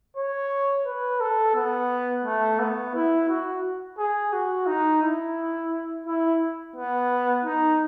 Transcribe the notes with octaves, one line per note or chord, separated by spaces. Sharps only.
C#5
B4
A4
B3
A3
B3
E4
F#4
G#4
F#4
D#4
E4
E4
B3
D#4